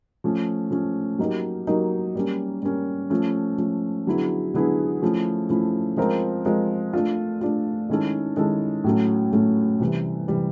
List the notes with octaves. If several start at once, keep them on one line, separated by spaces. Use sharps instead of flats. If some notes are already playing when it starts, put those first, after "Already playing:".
F3 A3 C#4
F3 A3 C#4
F#3 A#3 D#4 G4 A#4
F#3 A#3 D#4 G4 A#4
G3 A#3 C#4
G3 A#3 C#4
F3 A3 C#4
F3 A3 C#4
D3 F#3 B3 E4 G#4
D3 F#3 B3 E4 G#4
F3 A3 C#4 E4
F3 A3 C#4 E4
F3 G#3 C4 F4 A#4
F3 G#3 C4 F4 A#4
A3 D4 F4
A3 D4 F4
D#3 G#3 C#4 E4 A4
D#3 G#3 C#4 E4 A4
A2 F#3 A3 C#4
A2 F#3 A3 C#4
C3 E3 G3
C3 E3 G3